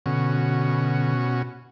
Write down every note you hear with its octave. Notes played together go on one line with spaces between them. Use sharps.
B2 D3 C#4 F#4